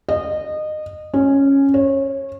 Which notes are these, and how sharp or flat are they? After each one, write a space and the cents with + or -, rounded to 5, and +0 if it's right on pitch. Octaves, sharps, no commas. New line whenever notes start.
D#5 -25
C#4 -5
C#5 -25